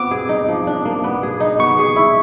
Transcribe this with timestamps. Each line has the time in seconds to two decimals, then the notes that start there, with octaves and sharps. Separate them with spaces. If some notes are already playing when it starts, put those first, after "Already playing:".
Already playing: B3 C4 F4 D6
0.11 G#4
0.29 D#4
0.49 F3
0.67 D4
0.85 A#3
1.04 B3
1.23 G#4
1.40 D#4
1.59 B3 C#6
1.79 G#4
1.96 E4